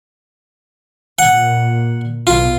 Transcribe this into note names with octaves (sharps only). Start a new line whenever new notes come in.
A#2 F#5
B1 B2 F4